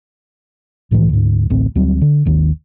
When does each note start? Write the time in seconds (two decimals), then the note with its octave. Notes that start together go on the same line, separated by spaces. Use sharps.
0.91 C2 A2 D#3 E3
1.09 D2 G#2
1.50 D1 A1 D2 C4
1.75 D2 F#3 G3 C4
2.01 D3
2.25 G#1 D#2 D#3